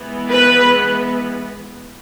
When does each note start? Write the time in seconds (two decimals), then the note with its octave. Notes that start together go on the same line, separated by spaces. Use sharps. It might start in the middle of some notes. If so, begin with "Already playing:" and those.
Already playing: E3 G#3 B3
0.30 B4